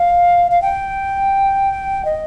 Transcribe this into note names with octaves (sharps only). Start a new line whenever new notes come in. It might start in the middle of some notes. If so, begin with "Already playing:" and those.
Already playing: F5
F5
G5
D#5